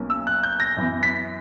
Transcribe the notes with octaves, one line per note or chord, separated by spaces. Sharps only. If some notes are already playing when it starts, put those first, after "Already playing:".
Already playing: B1 B2 A#3 C#4
E6
F#6
G6
A#6
F#2 E3 B3
B6